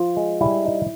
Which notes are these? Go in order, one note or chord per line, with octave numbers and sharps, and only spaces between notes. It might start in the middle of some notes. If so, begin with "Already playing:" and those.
Already playing: F3 F4
G#3
G3 E4
D#4